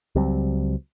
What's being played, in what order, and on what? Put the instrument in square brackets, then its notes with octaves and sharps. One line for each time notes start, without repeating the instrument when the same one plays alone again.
[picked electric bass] C#2 F#3 G3 C4